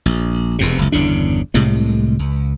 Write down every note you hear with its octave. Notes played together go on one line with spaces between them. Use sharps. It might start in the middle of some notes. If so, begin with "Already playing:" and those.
A#1
E1 E2 C3
F#1 C#2
G1 E2 C#3 D4
C2 A2 C3 G#3
C#2